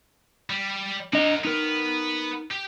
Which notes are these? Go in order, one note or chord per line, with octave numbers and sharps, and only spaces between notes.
G3
D4 A#4 D#5 F#5
B3 D#4 A#4
G4